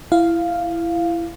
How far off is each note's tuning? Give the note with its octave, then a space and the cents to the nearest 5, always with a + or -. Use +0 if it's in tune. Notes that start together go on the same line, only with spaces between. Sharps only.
E4 +20 F5 +0